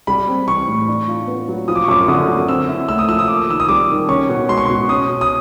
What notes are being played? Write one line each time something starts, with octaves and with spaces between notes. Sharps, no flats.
G3 B5
C4
E3 C#6
A2
D4
F4
B3
F#3
F3 D#6
D6
C#6
F#2 D6
D3 D#6
F#2
C4 E6
E4
A3 E6
D#6
F3 E6
D#6
A#3 D6
D#3 E6
D#6
G3 D6
D#3
C#4 C#6
B2
G#3 C6
C#6
B2 C6
C#4 D#6
B2
D#6